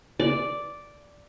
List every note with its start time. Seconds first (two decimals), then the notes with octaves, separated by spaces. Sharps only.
0.20 D5